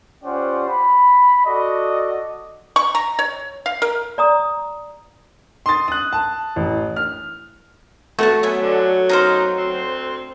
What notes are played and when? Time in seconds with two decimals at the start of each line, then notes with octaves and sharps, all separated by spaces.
0.24 C#4 F4 G4 C5 D5 F#5
0.68 B5
1.46 F#4 A4 D5 D#5
2.76 C#6
2.95 A#5
3.19 C#5
3.66 F5
3.82 A#4
4.18 D5 A#5 D#6
5.66 C6 D#6 A6
5.88 D#6 F#6
6.13 A5
6.56 A1
6.96 F6
8.19 A3 F#4 F#5 A5
8.43 F#3 B3 E5 G#5
8.62 D3
9.09 F#2 B2 D#4 C5 F5 A#5
9.58 D2 C4